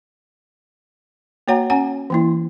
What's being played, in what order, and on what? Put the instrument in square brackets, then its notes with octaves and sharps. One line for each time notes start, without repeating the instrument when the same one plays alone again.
[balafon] A#3 F#4 C#5 F#5 A#5
C#4 C#5 F#5 G#5 A#5
E3 A#3 E4